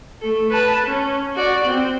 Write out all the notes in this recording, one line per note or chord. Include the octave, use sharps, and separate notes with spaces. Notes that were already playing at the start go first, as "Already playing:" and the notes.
A3 A4
B4 A5
C#4
F#4 D5
C4